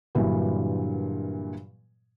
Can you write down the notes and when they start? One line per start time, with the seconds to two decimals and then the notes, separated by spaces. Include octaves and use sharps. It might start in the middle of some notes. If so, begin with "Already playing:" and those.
0.15 G2 A#2 D3 E3 F#3